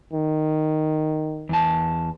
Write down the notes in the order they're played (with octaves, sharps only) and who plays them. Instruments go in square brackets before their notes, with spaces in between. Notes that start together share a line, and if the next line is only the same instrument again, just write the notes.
[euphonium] D#3
[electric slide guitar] E2 A5